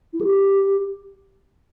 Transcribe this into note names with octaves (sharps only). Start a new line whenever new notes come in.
E4
A4
G4